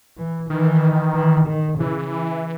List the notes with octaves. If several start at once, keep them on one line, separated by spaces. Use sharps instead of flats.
E3
D#3 E3
E3
D#3
C#3 E3